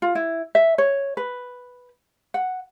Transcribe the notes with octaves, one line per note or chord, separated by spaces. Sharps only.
F4
E4
E5
C#5
B4
F#5